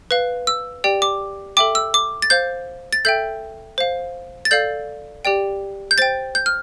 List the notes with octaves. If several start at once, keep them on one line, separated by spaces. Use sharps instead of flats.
B4 F5
E6
G4 D5 G5
D6
A4 E5 G5 D6
E6
D6
A6
C5 F5 G6
A6
A4 E5 G5 G6
C5 F5
A6
A4 D5 F5 G6
G4 D5 G5
G6
C5 G5 A6
G6
F6